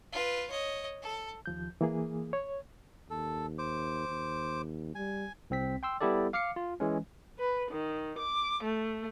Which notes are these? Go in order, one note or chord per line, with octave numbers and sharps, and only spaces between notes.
F4 B4
C#5 D#5
A4
D#2 F3 G6
E3 A#3 G#4
C#5
D#2 A4
C5 D6
D#2
G3 G#5
C2 C4 B6
G5 C6 E6
G3 B3 E4 G4 A4 D5
F5 D6 F6 C7 C#7
F4
E3 G#3 C#4
B4
D#3
D6
A3